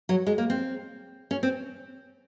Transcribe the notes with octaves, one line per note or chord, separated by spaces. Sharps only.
F#3
G#3
A#3
C4
C#4
C4